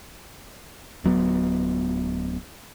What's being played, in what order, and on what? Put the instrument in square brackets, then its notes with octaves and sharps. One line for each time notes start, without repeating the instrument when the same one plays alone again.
[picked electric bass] D1 F#3 B3